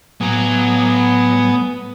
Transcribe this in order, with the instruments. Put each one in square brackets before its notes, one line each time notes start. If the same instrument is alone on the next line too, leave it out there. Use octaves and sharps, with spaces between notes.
[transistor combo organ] A2 G#5 D#6 [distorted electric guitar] F#3 [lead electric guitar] B3 A#5